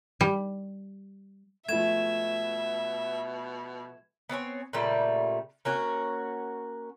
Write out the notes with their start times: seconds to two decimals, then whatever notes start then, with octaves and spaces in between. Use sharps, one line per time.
0.21 G3
1.69 B2 F3 G#3 A3 E5 G#6 E7
4.29 B3 C4 C#5 G#5
4.73 A#2 C#3 G3 A3
5.65 A#3 C#4 F#4 G#5